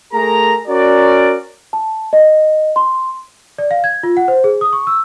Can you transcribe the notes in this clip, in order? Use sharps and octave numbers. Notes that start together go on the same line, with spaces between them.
A3 G#4 A#4 A#5
C#4 F#4 A#4 D5
A5
D#5
C6
D5
F5
G#6
F4
F#5
C5
G#4
D#6
C#6
E6